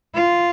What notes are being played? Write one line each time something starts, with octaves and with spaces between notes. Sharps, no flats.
F4